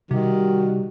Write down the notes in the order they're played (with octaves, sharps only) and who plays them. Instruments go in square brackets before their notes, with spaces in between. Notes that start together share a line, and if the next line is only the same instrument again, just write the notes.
[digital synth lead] C3 [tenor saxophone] D#3 [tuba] G3 [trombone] F#4